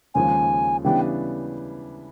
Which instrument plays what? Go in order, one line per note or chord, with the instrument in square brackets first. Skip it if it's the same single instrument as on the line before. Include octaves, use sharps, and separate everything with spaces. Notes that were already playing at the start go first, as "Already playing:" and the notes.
[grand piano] D#2 C#3 F3 G#3 [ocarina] G#5
[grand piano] C#3 E3 G3 B3 D4 [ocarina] G5